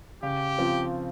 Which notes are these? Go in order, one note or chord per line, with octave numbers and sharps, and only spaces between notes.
C#3 G4
F3 C4 F4